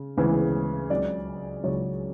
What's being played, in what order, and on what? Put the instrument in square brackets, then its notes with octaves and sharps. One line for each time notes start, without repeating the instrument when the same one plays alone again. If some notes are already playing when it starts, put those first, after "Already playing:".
Already playing: [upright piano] C#3
D2 C#3 E3 G#3 B3
C#2 C#3 F#3 D5
C#2 C#3 F#3 C#5